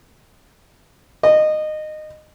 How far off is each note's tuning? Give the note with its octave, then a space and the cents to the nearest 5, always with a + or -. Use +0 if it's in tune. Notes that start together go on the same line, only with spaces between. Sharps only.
D#5 -20